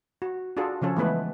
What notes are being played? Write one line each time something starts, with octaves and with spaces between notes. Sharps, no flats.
F#4
D4 F4 F#4 G#4 A4
C#3 F3 C#4 A4
E3 G#3 A3 B3 B4